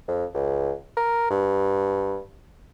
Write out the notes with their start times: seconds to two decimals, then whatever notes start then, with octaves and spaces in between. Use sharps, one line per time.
0.08 F2
0.34 C#2
0.97 A#4
1.30 G2